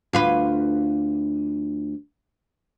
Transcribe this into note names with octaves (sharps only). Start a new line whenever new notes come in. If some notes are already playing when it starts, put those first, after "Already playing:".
D2 F4 B4